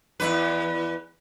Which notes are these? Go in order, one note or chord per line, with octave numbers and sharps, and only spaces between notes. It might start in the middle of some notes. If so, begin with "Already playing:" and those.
E2 C#3 B4